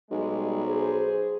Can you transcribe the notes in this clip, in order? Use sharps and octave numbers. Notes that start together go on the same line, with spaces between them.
B1 G3 G#3
G#4 C5